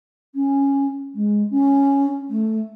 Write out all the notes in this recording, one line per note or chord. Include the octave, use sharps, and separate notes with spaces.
C#4
G#3
C#4
A3